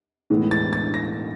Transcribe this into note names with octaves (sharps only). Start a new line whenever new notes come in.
A2 E3 G#3 B3
A6
A6
A#6